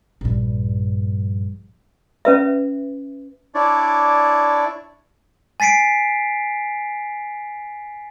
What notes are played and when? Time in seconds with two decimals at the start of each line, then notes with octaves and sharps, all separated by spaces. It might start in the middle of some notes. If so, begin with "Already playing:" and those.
0.21 A#1 G2
2.25 C#4 B4 E5
3.55 D4 E4 C#5 D5
5.60 G#5 A6 B6 C7 D7